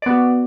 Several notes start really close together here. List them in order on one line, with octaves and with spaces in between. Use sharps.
D5 B3 F#4